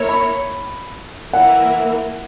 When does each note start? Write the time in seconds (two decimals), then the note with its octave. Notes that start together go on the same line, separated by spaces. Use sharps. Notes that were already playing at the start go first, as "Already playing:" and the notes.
Already playing: A#3 E4 A#4 C#5
0.09 B5
1.33 E3 A#3 E4 A#4 F#5